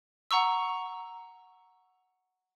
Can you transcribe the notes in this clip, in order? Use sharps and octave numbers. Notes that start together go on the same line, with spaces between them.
F#5 A#5 C#6 E6